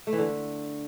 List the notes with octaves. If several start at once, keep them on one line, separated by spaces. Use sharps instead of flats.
A3
E3
D3